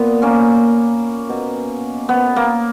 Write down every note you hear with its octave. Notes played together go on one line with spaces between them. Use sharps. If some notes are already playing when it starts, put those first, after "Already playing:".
Already playing: A#2 B3
A#3 C#4
B2
B3
A#3